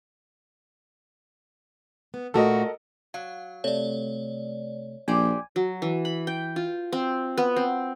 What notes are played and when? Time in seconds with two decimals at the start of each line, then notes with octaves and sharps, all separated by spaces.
2.14 B3
2.34 A#2 A3 F#4 A4 A#4 D#5
3.14 F#3 F5
3.64 C3 A3 C#5 D5
5.08 A#1 G4 C5 D5 G#5
5.56 F#3
5.82 E3
6.05 B5
6.27 G5
6.56 F4
6.93 C4
7.37 B3
7.56 C4